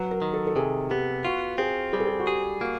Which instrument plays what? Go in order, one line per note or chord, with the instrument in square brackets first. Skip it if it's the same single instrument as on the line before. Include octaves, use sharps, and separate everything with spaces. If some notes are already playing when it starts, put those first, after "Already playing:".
Already playing: [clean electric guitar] F#3 [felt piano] B4
[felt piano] A#4
[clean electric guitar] D#3
[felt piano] A4
A4
[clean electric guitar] C3 [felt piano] G#4
[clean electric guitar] B3 [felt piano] G4
[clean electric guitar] F4 [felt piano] F#4
[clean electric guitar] C4 [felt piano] G#4
[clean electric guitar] G3 [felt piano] G#4
[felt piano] A4
G#4
F#4
[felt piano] G4 [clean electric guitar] G#4
[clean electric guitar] A#3 [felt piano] F#4